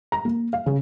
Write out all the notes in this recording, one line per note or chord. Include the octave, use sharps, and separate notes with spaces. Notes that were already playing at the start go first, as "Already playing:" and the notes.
A#5
A#3
F5
C#3